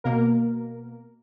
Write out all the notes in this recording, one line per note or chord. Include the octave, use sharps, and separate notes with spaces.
B2 A#3 A#4